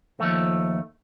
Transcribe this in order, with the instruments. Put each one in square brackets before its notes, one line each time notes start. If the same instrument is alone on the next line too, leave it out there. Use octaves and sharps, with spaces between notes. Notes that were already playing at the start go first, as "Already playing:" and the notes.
[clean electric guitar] D#2 A3 [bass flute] F3